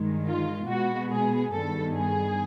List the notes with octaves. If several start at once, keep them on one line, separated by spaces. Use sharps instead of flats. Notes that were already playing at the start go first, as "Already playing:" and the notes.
Already playing: G2 D#3 G#3
F4
B2 G#3 B3 F#4
G#4
G2 D#3 G3 B3 A4
G#4